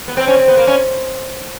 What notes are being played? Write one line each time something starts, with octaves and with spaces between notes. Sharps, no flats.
B3
C4
C#4
C4
B3
A#3
C#4